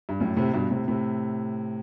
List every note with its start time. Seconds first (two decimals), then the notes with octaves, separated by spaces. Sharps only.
0.09 G2
0.20 F#2 A2
0.37 A2 C3
0.54 G2 B2
0.70 A2 C3
0.88 A2 C3